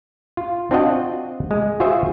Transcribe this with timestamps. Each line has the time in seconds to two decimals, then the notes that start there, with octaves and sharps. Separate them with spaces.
0.37 F4
0.71 C4 D4 F4 F#4 D#5 F#5
1.51 G#3
1.80 F4 F#4 G#4 C5 E5